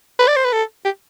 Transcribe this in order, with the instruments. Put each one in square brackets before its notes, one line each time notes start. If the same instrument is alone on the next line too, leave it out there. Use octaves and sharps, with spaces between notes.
[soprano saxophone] B4
D5
C5
B4
A4
G4